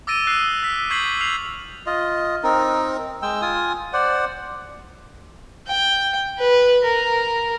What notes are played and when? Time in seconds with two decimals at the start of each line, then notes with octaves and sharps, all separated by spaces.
0.07 D6 E6 A6 A#6 D7 D#7
0.27 D#6 E6 F#6 A#6 C7 D#7
0.63 E6 B6
0.90 C#6 G6 G#6 B6 C7 F#7
1.21 F6 C7 F7 F#7
1.86 F4 D#5
2.43 C4 D#4 A#4
3.22 G#3 G5 E6
3.42 F4 G#5 D#6
3.93 C5 D5 F#5
5.67 G5
6.38 B4
6.84 A#4